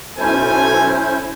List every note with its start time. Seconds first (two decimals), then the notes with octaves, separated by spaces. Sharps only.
0.18 B1 C#4 E4 A4 C5 G#5